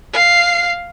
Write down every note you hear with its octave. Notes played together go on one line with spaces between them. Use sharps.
F5 C7